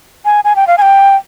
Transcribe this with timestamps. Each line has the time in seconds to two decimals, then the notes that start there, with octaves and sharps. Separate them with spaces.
0.25 G#5
0.44 G#5
0.56 G5
0.67 F5
0.78 G#5
0.82 G5